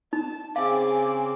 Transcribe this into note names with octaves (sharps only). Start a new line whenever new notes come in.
D#4 A5
C#3 C4 F5 G#5 D6